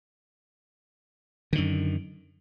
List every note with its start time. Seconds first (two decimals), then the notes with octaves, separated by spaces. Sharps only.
1.53 D3
1.55 D#3
1.58 F#2